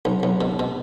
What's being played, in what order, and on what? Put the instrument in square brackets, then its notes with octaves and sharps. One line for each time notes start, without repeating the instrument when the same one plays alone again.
[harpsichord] B1
B1
B2
B2